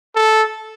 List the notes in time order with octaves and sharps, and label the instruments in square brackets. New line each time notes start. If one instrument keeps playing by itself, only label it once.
[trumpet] A4